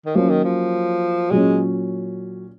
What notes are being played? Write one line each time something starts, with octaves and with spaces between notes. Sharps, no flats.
D#3
F3 F#3 A#3 C#4
D#3
F3
A#2 F#3 G#3 C#4